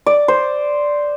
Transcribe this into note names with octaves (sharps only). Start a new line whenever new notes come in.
D5
C5